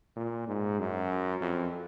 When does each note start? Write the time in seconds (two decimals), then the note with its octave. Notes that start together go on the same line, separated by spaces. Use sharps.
0.16 A#2
0.48 G#2
0.80 F#2
1.41 F2